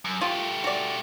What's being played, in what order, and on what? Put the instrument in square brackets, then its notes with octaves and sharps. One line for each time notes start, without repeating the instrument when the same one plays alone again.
[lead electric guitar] F#2
[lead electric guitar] A3 G4 [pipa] F4
[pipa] F#4 D5